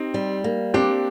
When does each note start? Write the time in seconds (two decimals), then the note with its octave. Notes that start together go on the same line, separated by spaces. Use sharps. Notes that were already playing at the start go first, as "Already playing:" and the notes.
Already playing: C4 D#4 G4
0.14 G3
0.44 A#3
0.74 C4 D4 G4